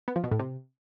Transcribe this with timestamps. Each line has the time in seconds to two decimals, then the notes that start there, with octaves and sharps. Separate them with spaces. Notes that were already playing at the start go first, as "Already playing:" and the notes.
0.08 B3
0.16 F3
0.24 B2
0.31 A2
0.39 C3